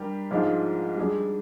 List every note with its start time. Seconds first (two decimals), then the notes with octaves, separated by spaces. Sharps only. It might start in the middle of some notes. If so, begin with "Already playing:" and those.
Already playing: G3 D4 G4 A#4
0.31 G#2 F3 G#3 D4 F4
0.97 G3 D4 G#4